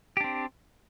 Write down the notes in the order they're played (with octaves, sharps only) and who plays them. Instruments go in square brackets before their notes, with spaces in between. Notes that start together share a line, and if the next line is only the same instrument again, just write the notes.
[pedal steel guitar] G4
D4
C4